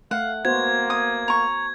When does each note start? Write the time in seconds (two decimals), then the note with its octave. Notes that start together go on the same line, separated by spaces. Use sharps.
0.11 A3 F5 F#5
0.45 A#3 B3 F#4 C5 G#6
0.90 D#6
1.28 A#5 C#6